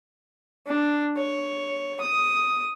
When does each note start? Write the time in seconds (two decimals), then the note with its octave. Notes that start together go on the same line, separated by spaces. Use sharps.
0.67 D4
1.17 C#5
2.01 D#6